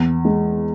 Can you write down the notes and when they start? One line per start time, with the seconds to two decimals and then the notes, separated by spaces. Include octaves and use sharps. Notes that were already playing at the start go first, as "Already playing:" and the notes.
Already playing: E2
0.25 G#3